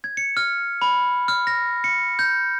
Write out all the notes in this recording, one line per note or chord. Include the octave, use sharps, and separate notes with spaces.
G#6
C#7
F6
B5
F6
A#6
C#7
G6